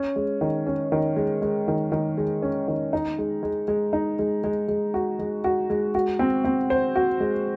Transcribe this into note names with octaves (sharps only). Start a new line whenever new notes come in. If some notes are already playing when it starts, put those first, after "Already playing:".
Already playing: C#4
G#3
D#3
C#4
D#3
G#3
G#3
D#3
D#3
G#3
C#4
D#3
D#4
G#3
G#3
G#3
D#4
G#3
G#3
G#3
F#4
G#3
F#4
G#3
F#4
C4
C4
C5
F#4
G#3